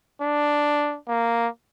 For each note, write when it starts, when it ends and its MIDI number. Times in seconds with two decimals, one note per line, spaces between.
0.22 0.97 62
1.09 1.48 58